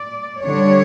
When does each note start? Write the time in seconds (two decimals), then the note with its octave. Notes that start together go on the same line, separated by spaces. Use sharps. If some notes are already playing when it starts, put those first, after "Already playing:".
Already playing: D5
0.43 D3 G3 D4 C#5